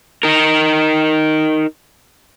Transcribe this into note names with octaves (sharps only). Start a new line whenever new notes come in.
D#4 A#4